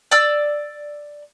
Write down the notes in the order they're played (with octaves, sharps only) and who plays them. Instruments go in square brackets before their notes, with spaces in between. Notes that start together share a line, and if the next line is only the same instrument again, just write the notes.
[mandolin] D5 E6